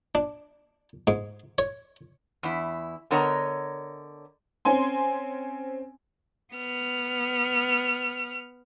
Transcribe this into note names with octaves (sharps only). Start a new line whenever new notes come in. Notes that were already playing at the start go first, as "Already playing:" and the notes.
D4
G#2
C#5
E2 E4
D3 B3 A#4 C#5 D#5 A#5
C4 C#4 G#5 C6
B3 F6